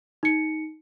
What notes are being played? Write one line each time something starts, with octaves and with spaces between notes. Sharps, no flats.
D#4 C#7